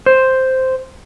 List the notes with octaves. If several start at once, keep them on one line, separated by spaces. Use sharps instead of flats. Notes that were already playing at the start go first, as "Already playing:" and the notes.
C5